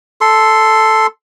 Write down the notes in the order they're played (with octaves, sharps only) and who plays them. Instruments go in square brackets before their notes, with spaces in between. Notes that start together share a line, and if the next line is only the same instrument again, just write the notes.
[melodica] A4 C6